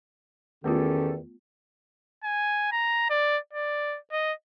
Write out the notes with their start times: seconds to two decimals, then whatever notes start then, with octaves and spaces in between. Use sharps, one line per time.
0.64 E2 D#3 A3 B3 C#4 F4 G4 A4
2.24 G#5
2.72 A#5
3.10 D5
3.53 D5
4.12 D#5